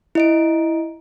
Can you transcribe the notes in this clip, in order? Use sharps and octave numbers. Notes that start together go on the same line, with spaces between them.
E4 D#5 D7